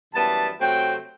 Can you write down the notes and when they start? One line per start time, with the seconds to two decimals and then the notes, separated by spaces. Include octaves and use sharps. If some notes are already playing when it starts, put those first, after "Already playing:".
0.14 F#2 E3 G3 B3 A5
0.60 C3 F#3 A3 C4 G5